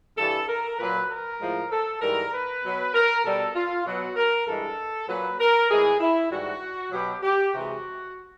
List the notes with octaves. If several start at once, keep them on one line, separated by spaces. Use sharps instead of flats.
G2 E3 G3 A4
A#4
A#2 F#3 B4
A#4
A2 F3 G#3
A4
G#2 E3 G3 A#4
B4
B2 F#3
A#4
B2 G3 A4
F4
B2 F#3 F#4
A#4
G2 E3 G#3 A4
A#2 F#3 B4
A#4
A2 E3 G#3 G#4
E4
G#2 E3 G3 F#4
B2 F#3 G4
G4
C3 E3 G#3 F#4